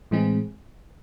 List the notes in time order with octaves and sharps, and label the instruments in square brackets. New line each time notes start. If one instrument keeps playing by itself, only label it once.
[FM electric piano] A2 E3 G#3 C4 G#4